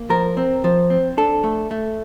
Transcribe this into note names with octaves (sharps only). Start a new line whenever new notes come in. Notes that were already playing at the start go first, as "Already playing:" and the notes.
Already playing: A#3
F3 A#4
C4
F3
C4
D4 A4
A3
A3